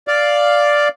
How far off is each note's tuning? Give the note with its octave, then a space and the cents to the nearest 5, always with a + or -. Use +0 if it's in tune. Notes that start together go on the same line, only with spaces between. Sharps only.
D5 +0 F5 +0